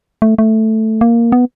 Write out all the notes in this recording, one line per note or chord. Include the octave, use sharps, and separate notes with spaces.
A3
A3
A#3
B3